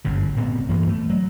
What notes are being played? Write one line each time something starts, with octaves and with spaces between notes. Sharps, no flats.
G1 F#2 C#3
A2 B3 C4
D2 G2 E3 A#3
A3
F#3